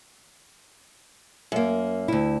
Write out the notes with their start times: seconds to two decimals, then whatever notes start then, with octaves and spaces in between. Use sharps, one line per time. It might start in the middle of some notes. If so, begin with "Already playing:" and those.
1.52 F#2 A#3
2.08 D2 E4